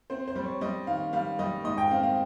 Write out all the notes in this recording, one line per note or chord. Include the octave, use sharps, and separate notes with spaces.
C4 C5
C5
G3
C#5
G3 D#5
D#3 F5
G3 F5
G3 D#5
G#2 D#5
G5
C4 F5
F5